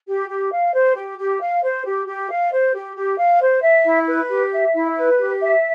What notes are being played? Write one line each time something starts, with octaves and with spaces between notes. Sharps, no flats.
G4
G4
F5
C5
G4
G4
F5
C5
G4
G4
F5
C5
G4
G4
F5
C5
E5
E4
B4
G4
E5
E4
B4
G4
E5